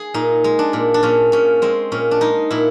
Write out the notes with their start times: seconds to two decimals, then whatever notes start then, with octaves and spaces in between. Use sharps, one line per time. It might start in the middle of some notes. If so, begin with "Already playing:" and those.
Already playing: G#4
0.14 A#2 D#4
0.44 G#3
0.59 D4
0.73 A#2
0.94 D4
1.03 A#2 C#4
1.32 A#2 C#4
1.62 G#3 C4
1.92 A#2 C#4
2.11 D4
2.21 G#3 D#4
2.51 A#2 E4